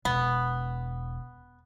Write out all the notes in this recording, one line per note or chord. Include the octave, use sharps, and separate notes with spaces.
E1 B3